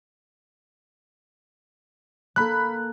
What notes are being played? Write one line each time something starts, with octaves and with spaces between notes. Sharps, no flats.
A#3 A4 B5 F#6